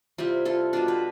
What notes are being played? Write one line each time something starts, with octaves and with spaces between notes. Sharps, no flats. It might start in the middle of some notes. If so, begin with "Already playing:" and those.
C3 G3 C4 E4 F4
F4 A4
B2 G3 D4 F4
B4